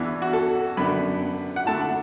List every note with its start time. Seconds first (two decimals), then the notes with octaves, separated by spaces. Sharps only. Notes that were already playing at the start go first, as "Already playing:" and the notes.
Already playing: E2 E3 B3 D4
0.22 F#4
0.33 A4
0.77 F#2 D3 B3 D4 B5
1.56 F#5
1.66 D3 A3 E4 A5
1.81 F#5